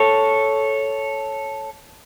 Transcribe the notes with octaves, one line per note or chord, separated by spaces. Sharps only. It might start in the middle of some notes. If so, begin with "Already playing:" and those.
Already playing: A4 C#5